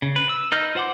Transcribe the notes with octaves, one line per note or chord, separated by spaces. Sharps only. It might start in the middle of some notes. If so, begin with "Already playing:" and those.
C#3
B4
E6
D#4 B4 D#5 F6 G6
F4 C5 F#5 C6 D6